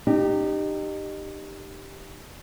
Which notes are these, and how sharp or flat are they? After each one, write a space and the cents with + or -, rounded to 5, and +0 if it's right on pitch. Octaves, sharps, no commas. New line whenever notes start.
D#4 -30 G4 +0